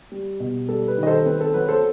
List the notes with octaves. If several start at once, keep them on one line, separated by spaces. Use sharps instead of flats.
G3
B2
G3 A4
B4
D#3
D#5
A4 C5
C4 B4
A4
F#3 B4
A4 C5